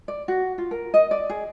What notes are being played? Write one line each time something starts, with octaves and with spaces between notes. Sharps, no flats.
D5
F#4
F4
A#4
D#5
D5
G#4